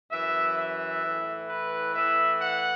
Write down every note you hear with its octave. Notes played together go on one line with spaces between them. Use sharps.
F#2 E3 E5
E5
A2 E3
B4
A2 E3 E5
F#5